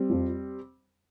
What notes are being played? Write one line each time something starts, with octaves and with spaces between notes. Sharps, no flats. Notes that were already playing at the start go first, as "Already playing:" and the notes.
Already playing: G3 C4
F2 F3